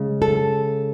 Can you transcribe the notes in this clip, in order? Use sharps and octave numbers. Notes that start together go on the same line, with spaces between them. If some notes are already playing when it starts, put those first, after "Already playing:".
Already playing: C#3 G#3
A4